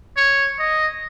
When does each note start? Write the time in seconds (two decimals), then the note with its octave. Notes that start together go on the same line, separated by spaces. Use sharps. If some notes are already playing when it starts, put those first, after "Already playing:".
0.17 C#5
0.59 D#5